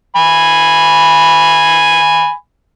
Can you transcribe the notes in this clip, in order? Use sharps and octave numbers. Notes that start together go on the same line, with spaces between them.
G#5 B5